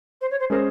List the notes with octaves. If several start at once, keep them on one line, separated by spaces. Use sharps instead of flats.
C5
C#5
C5
G#3 C#4 G#4 A#4 C5